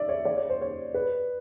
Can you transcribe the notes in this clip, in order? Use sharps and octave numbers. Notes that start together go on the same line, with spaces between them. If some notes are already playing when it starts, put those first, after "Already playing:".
Already playing: D5 E5
C#5
D5
C#5
C5
C#5
B4